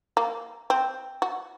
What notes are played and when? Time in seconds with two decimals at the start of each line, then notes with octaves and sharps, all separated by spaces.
0.17 A#3
0.70 C4
1.22 F#4